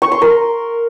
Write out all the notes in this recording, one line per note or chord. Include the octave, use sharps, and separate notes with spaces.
C#6
C6
A#4